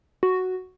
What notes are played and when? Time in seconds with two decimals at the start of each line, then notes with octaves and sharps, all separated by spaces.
0.23 F#4